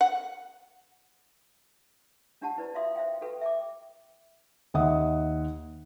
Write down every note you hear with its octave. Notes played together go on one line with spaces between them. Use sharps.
F#5
C#4 D4 F4 G4 F#5 A5
E4 B4 C5 D5
F4 F#4 E5 F5 C6 D#6
C5 E5 F5 G5
F#4 G4 A4 B4 G5
E5 G5 D6
D#2 D#5 E5 F#5 D#6